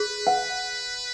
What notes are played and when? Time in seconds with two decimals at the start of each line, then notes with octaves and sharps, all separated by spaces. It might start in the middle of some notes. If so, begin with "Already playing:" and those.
Already playing: G#4 B4
0.27 F#5